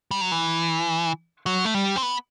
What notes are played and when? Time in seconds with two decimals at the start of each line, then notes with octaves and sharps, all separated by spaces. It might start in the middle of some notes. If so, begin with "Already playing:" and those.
0.11 G3
0.21 F#3
0.32 E3
1.46 F#3
1.65 A3
1.74 G3
1.96 C4
2.02 B3